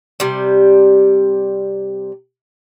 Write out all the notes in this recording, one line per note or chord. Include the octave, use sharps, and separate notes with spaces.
C3 G3